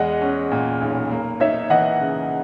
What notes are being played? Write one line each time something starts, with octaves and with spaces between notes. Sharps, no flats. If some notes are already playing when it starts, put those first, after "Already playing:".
Already playing: E2 G#3 D#5 F#5
C#4
A#2
B1
A#3
D#4 C#5 E5
E3 D#5 F#5
C#3